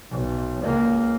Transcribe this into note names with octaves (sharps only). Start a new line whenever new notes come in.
B1
C#2 A#3